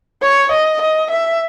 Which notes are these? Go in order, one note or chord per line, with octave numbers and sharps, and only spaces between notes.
C#5
D#5
D#5
E5